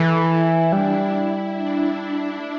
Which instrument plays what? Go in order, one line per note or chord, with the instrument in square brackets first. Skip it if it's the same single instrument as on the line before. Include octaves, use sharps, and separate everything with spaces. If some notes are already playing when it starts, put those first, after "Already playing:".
Already playing: [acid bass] E3 [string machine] A4
[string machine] E4
[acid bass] G3 [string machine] D4
[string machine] E4
D4
[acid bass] A3